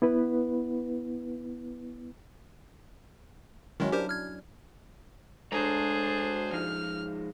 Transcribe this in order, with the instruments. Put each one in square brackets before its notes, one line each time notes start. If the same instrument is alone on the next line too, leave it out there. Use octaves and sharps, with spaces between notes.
[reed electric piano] B3 E4 B4
[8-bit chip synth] D#3 G#3 [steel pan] F#3 C#4 E4
[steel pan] D4 [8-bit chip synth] G4 A#4 C5
[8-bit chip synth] F6 G#6
[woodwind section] D2 D4 [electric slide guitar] G#3 C#5 A#5 [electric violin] G#4 C5
[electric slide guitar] F3 G#3 D#4 [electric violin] F6